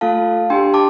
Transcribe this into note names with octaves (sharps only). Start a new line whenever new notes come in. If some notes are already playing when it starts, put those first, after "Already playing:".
A3 F4 A4 F5 A5
D4 G4 G5 C6
A5 D6